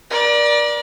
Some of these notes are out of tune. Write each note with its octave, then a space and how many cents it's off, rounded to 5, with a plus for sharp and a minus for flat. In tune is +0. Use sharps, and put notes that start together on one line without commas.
A#4 +40 D5 +0